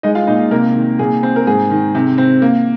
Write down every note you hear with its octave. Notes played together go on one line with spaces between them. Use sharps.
G#3 D#4 D#5
F4 F5
A#2 D#4 D#5
C3 A#3 A#4
D#3
A#2 G#4
C4
A#4
G#2 G#4
D#3
C3
C4
A#3